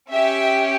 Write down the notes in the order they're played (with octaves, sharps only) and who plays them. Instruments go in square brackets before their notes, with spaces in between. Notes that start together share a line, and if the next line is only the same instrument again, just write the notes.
[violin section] C#4 G4 E5